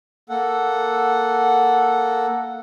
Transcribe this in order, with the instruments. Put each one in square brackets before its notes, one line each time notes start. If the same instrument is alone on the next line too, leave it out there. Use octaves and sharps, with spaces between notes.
[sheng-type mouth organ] A#3 A4 F#5